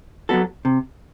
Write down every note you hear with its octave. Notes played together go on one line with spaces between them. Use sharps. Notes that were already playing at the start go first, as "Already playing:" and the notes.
F#3 B3 F#4 A4
C3